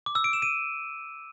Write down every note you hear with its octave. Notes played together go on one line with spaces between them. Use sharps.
D6
E6
D7
E7
D#7